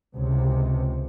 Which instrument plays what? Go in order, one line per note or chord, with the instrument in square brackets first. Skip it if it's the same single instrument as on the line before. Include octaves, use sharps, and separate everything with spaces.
[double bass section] C#2 C3